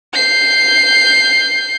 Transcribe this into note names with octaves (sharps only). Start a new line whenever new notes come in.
G6 C7